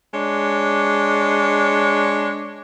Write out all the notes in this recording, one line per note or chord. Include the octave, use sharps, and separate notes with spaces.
G#3 D4 C#5